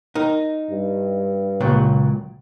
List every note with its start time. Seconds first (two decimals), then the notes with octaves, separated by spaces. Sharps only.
0.15 D#4 A#4
0.71 G2
1.61 C#2 A#2 F#3